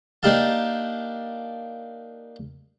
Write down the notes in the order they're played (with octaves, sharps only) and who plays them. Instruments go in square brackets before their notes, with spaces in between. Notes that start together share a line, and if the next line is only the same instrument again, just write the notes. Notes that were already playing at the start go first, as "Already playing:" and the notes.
[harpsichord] A#3 D4 D#4 G4 F5 A5